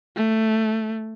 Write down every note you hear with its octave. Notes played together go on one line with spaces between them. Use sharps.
A3